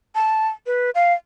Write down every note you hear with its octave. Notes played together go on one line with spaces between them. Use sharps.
A5
B4
F5